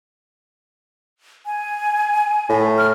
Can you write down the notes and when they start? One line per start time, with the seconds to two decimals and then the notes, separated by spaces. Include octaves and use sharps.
1.46 G#5
2.49 A2
2.78 F6